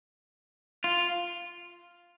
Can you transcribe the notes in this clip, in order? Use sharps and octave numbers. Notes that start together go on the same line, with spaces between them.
F4